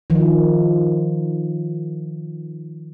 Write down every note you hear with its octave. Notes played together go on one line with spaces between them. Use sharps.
D#3 F3